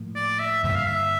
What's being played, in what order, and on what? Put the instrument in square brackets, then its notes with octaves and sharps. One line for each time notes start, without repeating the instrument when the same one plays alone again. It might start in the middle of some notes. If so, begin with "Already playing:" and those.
Already playing: [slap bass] A2 F3 A#3
[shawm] D5
E5
[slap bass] G2 D3 G3 A#3 [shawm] E5
[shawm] F5
E5